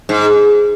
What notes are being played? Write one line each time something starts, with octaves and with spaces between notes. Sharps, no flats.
G#2